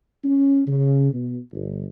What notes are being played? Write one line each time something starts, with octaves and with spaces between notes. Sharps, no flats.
C#4
C#3
B2
G1